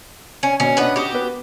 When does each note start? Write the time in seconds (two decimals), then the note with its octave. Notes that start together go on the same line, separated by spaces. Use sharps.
0.43 C#4
0.60 B2 C#4
0.77 B3 C#4 D4 B4 D#5
0.96 F#4 G4 B5 D#6
1.12 B3 B4